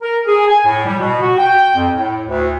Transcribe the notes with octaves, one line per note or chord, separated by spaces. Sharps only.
A#4
G#4
G#5
A2
G3
B2
F#4
G5
F2
A2
D2